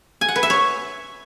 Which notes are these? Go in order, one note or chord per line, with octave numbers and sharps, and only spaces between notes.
G#5
F#5
B4
E5
C#5